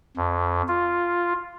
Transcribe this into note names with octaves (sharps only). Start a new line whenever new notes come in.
F2
F4